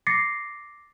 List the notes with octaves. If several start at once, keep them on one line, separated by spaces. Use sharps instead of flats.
D6 A6 A#6 C7 C#7